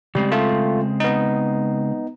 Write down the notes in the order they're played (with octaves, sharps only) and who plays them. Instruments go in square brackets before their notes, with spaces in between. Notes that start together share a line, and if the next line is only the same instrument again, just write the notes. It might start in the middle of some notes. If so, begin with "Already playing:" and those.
[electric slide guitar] C#3 G#3 C4 [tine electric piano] G3
[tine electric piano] A3 F4
B3 D#4